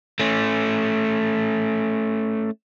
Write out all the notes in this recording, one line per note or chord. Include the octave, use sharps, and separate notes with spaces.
A3 C#4